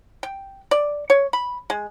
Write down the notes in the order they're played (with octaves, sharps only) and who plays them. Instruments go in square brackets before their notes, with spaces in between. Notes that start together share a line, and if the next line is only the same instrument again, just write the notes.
[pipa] G5
D5
C#5
B5
G#3